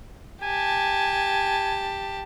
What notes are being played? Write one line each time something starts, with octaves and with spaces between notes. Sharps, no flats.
G4 G#5 A5